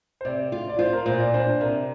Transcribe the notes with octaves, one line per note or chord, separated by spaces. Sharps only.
C5
C3 D5
F4
D5
F4 C5
A#4
A#2 C5
D5
D4 C5
C3 A#4